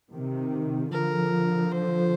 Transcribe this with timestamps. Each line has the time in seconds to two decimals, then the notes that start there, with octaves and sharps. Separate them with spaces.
0.12 C3 D#3
0.91 D3 F3 A#4
1.71 C5